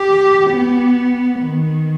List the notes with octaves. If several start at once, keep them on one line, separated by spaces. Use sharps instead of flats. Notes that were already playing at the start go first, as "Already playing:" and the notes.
Already playing: G4
B3
D#3